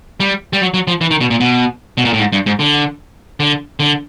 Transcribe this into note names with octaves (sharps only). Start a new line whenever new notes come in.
G3
G3
F#3
F#3
F3
E3
D#3
B2
A#2
B2
B2
A#2
A2
G#2
G2
G#2
D3
D3
D3